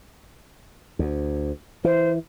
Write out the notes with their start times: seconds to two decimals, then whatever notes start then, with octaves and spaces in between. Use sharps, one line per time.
0.99 D2
1.84 E3 C5